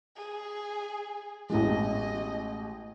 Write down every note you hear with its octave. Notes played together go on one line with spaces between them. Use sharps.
G#4
A1 B2 G#3 D#5